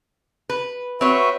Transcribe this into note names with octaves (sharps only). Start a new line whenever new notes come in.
B4
C4 F#4 B4 C#5 E5